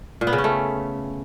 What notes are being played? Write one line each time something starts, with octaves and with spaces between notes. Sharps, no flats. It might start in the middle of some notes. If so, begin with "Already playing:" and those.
A#2
B3
C#3
C#4
A3